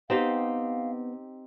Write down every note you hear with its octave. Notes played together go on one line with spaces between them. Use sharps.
B3 C4 D#4 G4 F5